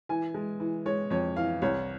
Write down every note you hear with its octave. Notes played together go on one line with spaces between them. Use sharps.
E3 G#5
G#3
E3
G#3 C#5
F2 C#5
E3 F5
C2 C#5